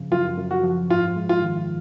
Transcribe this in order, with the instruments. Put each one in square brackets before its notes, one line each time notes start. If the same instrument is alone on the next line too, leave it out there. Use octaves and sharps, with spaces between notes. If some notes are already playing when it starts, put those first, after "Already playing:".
Already playing: [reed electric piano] F#2 C#3 F3
[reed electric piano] F#2 [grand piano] F4
[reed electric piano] F#2
[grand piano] F#4
[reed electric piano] F3
[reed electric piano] G#2 [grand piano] F4
[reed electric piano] G#3
[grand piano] F4
[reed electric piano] D#3